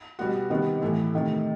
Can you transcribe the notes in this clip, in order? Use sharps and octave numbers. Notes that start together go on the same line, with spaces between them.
B2 G3 B3 F#4
C3 D#3 G3 B3
A2 E3 A3 E4
C3 D#3 A3